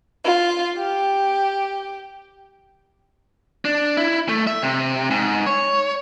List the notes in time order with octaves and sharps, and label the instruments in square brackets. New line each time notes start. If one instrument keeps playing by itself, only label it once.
[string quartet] F4
G4
[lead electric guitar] D4
E4
A3
E5
C3
G#2
C#5